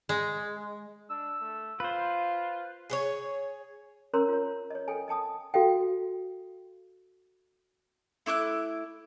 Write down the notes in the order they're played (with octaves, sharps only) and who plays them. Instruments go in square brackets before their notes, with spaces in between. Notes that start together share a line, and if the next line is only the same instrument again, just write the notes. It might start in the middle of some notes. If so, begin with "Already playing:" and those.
[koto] G#3
[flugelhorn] D4 [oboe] E6
[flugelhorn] A3
[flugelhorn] F4 [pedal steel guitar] B4 C5 [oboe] F5
[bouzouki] G#4 B4 C#5
[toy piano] C#4 A#4 C#5 A#5 C6 E6
F4 C#5
C#5 D#5
A4 G5 G#5
D#5 G5 A5 D#6
F#4 A4 F5 G5
[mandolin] A3 E4 D6 F#6